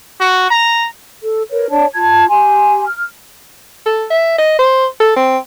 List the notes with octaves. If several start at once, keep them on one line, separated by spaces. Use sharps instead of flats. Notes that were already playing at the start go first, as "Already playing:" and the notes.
F#4
A#5
A4
A#4 B4 C#5
D4 C#5 D5 A5
F4 A5 G#6
G4 G#5 C6
F6
A4
E5
D#5
C5
A4
C4